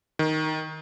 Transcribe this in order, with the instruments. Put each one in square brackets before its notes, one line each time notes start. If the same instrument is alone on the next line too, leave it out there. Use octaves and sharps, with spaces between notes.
[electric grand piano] D#3